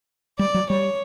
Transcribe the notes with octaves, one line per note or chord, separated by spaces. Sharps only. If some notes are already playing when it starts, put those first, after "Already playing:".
G3 D5
F#3
G3 C#5